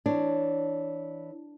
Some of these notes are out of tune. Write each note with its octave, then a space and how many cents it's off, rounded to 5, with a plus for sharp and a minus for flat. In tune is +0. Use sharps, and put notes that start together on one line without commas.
E3 -10 D4 +0 C#5 +0